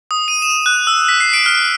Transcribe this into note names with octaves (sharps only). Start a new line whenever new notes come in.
D#6
D#7
E7
F#6
E6
B6
C7
D7
F6